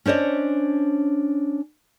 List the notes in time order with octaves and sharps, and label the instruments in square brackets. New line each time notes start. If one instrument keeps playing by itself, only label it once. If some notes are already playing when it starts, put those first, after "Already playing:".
[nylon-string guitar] C#4 D4 C5 C#5 D#5